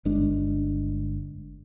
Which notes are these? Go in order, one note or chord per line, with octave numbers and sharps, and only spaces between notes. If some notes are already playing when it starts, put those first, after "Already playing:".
G1 G#3 D4